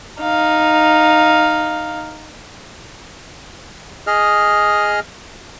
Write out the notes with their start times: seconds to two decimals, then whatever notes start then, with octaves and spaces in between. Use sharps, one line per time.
0.21 D#4 F5
4.07 G#4 D#5 F6